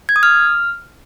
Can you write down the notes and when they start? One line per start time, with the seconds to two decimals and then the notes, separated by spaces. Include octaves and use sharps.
0.09 G#6
0.16 D#6
0.23 F6